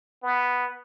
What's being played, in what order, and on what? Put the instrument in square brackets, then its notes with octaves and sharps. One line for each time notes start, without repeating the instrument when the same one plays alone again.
[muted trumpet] B3